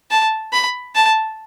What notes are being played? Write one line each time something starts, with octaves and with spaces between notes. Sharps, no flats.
A5
B5
A5